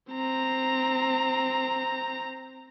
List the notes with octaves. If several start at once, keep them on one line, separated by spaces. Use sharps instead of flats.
C4 A#5